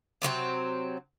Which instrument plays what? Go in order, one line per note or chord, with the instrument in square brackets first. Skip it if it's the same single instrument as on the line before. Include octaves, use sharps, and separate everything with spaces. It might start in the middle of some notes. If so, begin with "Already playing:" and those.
[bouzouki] C3 F#3 A#3 C4